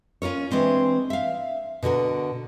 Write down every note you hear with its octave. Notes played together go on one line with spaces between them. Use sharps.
C#4 F4 A#4 C#5
E3 G#3 C4 D4
E5 F5
B2 D3 F#4 A#4